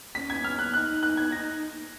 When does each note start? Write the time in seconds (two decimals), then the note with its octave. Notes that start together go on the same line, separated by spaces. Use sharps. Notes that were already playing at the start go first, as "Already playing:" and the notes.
0.15 C#4 B6
0.30 G#6
0.44 F6
0.59 F#6
0.73 D#4 F#6
1.03 F#6
1.17 G#6
1.32 D#4 A#6